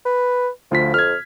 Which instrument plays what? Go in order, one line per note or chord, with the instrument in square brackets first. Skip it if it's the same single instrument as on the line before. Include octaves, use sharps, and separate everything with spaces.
[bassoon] B4
[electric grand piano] D2 F4 B6 [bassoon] F3
[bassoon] F2 [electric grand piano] F6 G#6